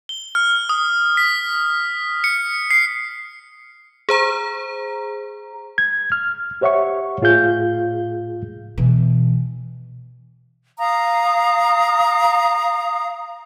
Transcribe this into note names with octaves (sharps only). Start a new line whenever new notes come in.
G7
F6
D#6
B6
C#7
C7
G#4 C5 A#5
G#6
F6
G4 C5 C#5 E5 F#5 C#6
A2 F4 G#4 F5 G6
B2 E3
F5 A#5 D#6